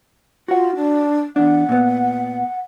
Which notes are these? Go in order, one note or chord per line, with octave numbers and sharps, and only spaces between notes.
F4 F#4 F#5
D4
E2 D4 F#5
A#2 B3